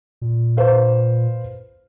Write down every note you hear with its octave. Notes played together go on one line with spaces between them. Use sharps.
A#2
B4 C5 F5